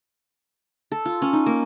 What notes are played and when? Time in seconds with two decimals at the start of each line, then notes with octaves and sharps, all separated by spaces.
0.92 A4
1.05 F4
1.22 C#4
1.33 D#4
1.46 A#3